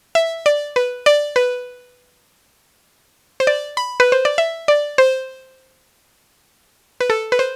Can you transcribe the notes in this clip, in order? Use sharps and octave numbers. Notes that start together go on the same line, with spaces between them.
E5
D5
B4
D5
B4
C5
D5
B5
B4
C5
D5
E5
D5
C5
B4
A4
B4
C5